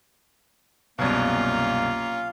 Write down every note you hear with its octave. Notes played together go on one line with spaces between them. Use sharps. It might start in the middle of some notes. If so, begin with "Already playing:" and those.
C2 F#2 B2 A#3 C#4 F4 F5